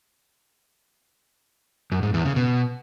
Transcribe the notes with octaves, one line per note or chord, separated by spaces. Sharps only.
F#2
G#2
E2
C#3
B2